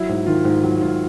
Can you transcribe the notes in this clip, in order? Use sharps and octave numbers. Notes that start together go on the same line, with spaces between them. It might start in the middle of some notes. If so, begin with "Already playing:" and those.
Already playing: F#3 E4
G#2
D#3 F4
G#2
F#3
G#2 F4